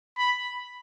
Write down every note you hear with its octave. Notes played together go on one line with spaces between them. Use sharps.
B5